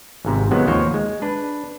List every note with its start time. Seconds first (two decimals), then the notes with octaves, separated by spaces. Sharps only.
0.25 G#1 G#2 C3
0.51 C3 D#3 F3 F#3 G#3 B3
0.67 D#2 F3 A#3 C5 C#5
0.94 G#3
1.22 D4 B4